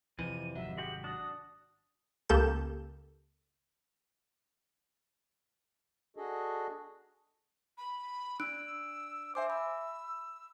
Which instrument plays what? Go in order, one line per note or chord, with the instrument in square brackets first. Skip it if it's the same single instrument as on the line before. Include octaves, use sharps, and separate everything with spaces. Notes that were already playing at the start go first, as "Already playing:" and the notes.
[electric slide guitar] F2 [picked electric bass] C3 E3 [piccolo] D#7
[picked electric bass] G#1 C3 F#3 [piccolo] E5
[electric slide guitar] G#3 F#4 G4 [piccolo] F#7
[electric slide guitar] D4 F#4 [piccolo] D#6
[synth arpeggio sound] C#2 A#3 G4 A4 G6 E7
[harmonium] D4 F#4 G#4 A4 D#5
[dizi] B5
[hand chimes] D4 F#6 D7 [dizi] E6
[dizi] C5 [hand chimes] E5 G#5 D6
[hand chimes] B5 [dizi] E6